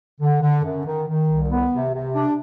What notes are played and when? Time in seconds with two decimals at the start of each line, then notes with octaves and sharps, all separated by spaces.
0.21 D3
0.42 D3
0.64 F#2
0.85 D#3
1.07 D#3
1.28 C2
1.50 B3
1.72 C3
1.93 C3
2.15 D4